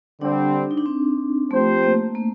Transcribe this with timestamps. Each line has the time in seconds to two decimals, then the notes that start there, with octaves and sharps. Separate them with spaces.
0.21 D3 G3 C4 D4
0.71 D#4
0.78 D4
0.86 C4
1.50 F3 A3 C4 G4 C5
1.83 A#3
2.15 A#3